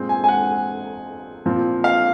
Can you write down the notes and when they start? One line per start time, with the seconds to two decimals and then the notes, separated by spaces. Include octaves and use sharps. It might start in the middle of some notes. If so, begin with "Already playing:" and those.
Already playing: A#2 G#3 C4
0.09 G#5
0.24 G#5
0.29 F#5
1.46 A#2 F3 C4
1.84 F5